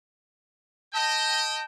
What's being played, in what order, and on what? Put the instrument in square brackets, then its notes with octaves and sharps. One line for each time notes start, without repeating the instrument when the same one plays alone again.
[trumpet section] D#5 G5 [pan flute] A5